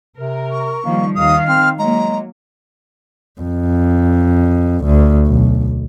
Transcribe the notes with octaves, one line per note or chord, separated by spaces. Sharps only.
C3 A#4
C#6
D#3 F3 G3 A#3
D#2 D#3 F5 D#6
C4 F6
F#3 G#3 A#3 A#5
F2
D2
B1